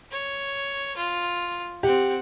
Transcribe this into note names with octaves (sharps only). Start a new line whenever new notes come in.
C#5
F4
C4 G4 F#5